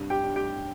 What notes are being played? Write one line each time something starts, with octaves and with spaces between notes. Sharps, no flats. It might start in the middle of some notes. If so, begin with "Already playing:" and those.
Already playing: C2 G2
G4 G5
G2
G4 G5